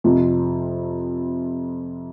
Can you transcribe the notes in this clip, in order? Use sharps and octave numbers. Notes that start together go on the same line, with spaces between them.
F2 C3 F3